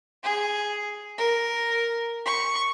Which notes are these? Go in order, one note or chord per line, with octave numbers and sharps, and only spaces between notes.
G#4
A#4
C#6